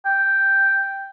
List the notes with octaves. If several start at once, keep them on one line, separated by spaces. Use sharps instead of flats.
G5